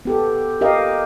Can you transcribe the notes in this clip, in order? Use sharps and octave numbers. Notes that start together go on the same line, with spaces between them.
B3 G4 A4
G4 A#4 D#5 F5